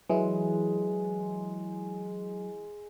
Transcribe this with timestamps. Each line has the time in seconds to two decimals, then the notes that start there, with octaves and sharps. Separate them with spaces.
0.09 E3 F#3 G#3 E4